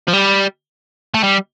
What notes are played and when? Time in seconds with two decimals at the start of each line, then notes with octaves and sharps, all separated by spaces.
0.08 F3
0.13 G3
1.14 A3
1.24 G3